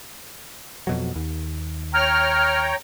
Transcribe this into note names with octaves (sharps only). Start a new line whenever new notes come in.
F2 B2 F#3
D#2
C#5 G5 A#5 F6